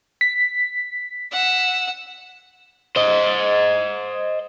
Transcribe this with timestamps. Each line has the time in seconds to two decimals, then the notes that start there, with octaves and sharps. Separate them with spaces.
0.21 B6
1.32 F#5 E6
2.96 C5 D#5